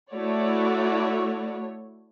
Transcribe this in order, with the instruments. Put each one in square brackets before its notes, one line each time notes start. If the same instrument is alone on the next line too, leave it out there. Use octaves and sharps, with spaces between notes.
[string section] A3 C#5 [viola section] E4 F#4 D5